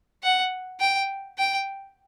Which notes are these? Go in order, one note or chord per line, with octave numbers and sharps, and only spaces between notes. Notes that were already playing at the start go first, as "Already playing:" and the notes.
F#5
G5
G5